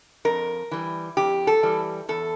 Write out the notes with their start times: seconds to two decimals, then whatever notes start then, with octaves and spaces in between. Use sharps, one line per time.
0.25 F2 A#4
0.71 E3 G3
1.17 F2 G4
1.47 A4
1.63 E3 G3
2.09 E2 A4